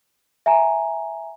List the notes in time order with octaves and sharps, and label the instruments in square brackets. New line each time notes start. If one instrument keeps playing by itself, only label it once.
[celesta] E5 G#5 A#5